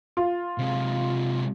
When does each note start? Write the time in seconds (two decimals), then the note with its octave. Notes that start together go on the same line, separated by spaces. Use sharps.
0.17 F4
0.58 C3 G#3